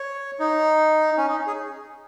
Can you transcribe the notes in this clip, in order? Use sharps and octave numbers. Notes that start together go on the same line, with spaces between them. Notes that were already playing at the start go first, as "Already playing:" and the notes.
Already playing: C#5
D#4
C#4
D#4
G#4